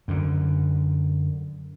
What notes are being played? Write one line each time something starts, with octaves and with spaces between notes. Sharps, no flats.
F#2 D3